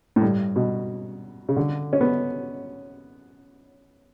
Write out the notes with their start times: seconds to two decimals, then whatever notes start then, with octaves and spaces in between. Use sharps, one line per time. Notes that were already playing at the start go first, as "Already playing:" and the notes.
0.16 A2
0.22 G2
0.56 B2
1.49 C#3
1.56 D3
1.93 C#4
2.01 B3